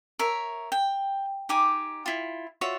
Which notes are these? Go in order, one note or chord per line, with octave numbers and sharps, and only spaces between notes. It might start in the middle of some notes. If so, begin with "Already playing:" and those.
A#4 C#5 E5
G5
D#4 G4 G#5 D6
E4 F4
F4 F#4 C#5 E5